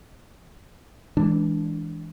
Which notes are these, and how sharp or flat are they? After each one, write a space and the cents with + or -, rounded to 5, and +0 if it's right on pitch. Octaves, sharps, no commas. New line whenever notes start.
E3 -20 G#3 +0 D4 -10